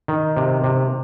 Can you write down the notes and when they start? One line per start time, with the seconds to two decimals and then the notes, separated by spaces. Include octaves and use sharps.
0.08 D#3
0.37 C3
0.64 C3